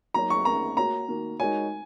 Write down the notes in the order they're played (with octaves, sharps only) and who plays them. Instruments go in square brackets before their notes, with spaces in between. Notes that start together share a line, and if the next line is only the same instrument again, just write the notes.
[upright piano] F#3 A#3 D#4 F#4 C#5 [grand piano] A#5
[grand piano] C#6
[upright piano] D#3 A#3 C#4 A#4 [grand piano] A#5
[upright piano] A#3 F#4 C#5 [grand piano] A#5
[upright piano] D#3 A#3 F#4
[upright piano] G#3 D#4 F#4 A#4 C#5 [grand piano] G#5